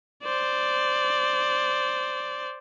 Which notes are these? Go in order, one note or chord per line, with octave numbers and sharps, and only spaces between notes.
C5 D5